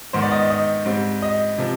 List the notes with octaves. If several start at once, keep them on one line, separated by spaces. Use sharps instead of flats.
G#2 D#3 B3 C5
D5
D#5
D#5
G#2 G3 C4
D#5
C3 F3